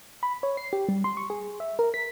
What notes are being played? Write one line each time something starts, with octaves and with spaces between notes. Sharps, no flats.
B5
C#5
C7
G4
G3
C6
C#6
G#4
E5
A#4
B6